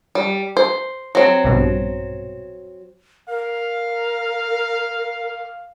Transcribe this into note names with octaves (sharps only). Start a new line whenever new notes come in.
G3
C5
F#3 C4
A#1 G2 B2
A#4 F5